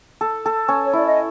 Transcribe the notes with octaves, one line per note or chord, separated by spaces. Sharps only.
A4
A4
C#4
C#5
E4 D5
D#5